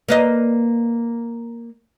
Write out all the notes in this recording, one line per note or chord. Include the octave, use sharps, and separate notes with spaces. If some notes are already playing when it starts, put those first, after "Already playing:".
A#3 B4 D#5